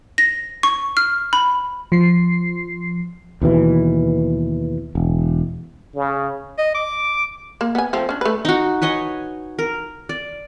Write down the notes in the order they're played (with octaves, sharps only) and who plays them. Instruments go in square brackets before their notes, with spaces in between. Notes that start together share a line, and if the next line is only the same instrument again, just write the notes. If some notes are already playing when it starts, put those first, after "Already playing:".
[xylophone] A#6
C#6
F6
B5
[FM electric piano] F3 C7
[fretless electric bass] D#2 B2 E3
E1
[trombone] C#3
[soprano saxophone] D#5
D6
[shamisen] A#3
B3 G#5
F3 A3 C4
C#4 D4
A3 B4
[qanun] D#4 F#4
B4 C#5 D#5 G#5
A#4
D5